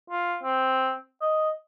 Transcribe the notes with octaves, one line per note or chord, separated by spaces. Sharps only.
F4
C4
D#5